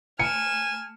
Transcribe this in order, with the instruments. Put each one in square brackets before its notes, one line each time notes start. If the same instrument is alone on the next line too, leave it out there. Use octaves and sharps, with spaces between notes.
[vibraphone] A3 [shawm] G#5 [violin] F6 E7 [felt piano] C#7